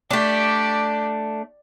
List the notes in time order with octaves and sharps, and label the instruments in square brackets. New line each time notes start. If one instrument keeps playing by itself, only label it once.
[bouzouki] A3 D4 [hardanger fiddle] G4 D5